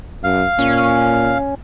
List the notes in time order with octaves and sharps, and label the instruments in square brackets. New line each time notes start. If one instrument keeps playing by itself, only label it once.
[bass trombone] F#2 [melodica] F5
[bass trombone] A#2 [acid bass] C#4